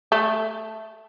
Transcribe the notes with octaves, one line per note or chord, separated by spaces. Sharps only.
A3